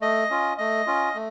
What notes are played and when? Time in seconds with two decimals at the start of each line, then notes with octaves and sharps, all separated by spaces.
0.01 A3 D#5
0.30 C#4 F4
0.58 A3 D#5
0.87 C#4 F4
1.15 A3